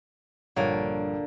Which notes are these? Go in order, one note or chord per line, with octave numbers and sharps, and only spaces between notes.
A#1 G2 D3 A#3 C#5